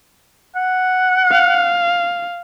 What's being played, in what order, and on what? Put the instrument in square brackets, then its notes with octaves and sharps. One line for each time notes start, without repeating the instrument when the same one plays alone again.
[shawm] F#5
[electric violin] F5